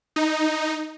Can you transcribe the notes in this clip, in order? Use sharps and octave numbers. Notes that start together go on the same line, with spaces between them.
D#4